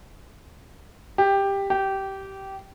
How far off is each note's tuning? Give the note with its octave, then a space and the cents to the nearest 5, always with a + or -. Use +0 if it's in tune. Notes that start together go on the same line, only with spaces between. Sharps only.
G4 +10
G4 -15